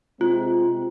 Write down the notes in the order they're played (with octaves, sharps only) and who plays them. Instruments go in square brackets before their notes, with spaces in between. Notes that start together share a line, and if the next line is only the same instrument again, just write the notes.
[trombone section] C3 G#3 C4 [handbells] F4